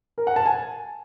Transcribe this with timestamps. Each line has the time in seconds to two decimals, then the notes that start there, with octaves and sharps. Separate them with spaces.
0.18 A#4
0.27 F#5
0.36 A5
0.46 G#5